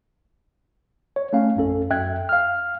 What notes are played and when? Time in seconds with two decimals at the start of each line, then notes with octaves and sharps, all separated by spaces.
1.16 C#5
1.33 A3 C#4 F5
1.56 A#1 F#2 C#4 A4
1.90 F#2 E5 G5 F#6 G#6
2.29 F5 F6